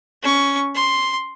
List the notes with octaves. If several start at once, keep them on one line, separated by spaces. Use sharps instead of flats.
C#4 C#6
C6